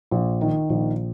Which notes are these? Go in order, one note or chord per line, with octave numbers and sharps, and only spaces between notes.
A#1
D#3
A#1